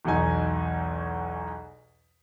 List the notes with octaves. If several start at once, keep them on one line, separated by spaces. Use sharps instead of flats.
B1 E2 B2 D#4 G#5